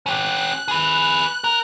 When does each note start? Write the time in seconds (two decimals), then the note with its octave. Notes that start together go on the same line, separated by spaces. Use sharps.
0.06 C#4 G4 F#6
0.68 G#4 B4
1.44 A#4